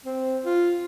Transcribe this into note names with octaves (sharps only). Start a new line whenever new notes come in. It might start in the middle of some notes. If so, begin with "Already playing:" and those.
C4
F4